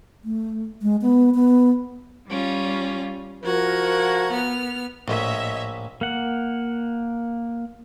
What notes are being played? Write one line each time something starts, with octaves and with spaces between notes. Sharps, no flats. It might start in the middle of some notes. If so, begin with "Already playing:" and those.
A3
G#3
B3
B3
G3 C#4 F4
F3 F#4 A#4 F#5 G#6
B3 F6
A#1 A2 C#5 D#5 E5
A#3 F#5